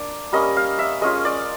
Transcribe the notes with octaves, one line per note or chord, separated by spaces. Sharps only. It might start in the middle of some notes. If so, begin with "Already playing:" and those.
Already playing: A#3 D4 D5
G3 A#3 C#4 D#5
F5
E5
G#3 C#4 F4 D#5
D5